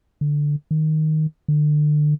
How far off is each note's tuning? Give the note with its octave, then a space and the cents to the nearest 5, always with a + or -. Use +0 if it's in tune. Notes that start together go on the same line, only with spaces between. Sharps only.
D3 +0
D#3 +0
D3 +30